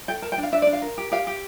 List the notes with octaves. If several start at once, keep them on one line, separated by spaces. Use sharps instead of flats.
A4 G5
A#4 A5
G5
D4
F5
D4 E5
D5
D4
F5
A#4
G4
G4 F5
G4